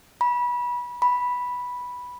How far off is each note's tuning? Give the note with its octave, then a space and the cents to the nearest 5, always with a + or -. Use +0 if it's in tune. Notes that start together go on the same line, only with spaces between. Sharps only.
B5 -25
B5 -5